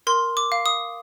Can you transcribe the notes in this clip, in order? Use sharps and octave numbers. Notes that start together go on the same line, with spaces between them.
A#4 C6
D6
F5
D#6